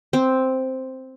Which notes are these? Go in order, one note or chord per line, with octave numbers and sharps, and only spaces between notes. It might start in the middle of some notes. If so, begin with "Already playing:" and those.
C4